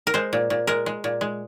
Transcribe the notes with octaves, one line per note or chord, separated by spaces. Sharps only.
A#4
G#3 C5
A#2
A#2
G#3 A#4
G#3
A#2
G#3